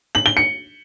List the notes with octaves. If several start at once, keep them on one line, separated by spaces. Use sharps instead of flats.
F#7
G7
C#7